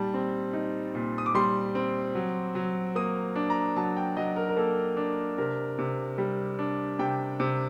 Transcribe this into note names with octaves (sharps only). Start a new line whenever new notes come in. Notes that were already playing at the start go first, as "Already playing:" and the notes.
Already playing: A#2 G3 D#4 A5
C4
D#4
A#2
D#6
D6
G3 C6
C4
F#3
F#3
A#3 D#6
D4
A#5
F#3 A5
G5
F#3 D#5
A#4
A#4
A#3 A4
D4
C3 A#4
C3
G3
D4
C3 G5
C3